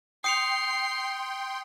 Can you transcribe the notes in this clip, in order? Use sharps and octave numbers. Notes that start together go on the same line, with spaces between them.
G5 C6 D#6 C7 C#7 F7